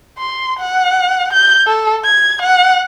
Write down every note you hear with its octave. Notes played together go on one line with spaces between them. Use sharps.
C6
F#5
G6
A4
G#6
F#5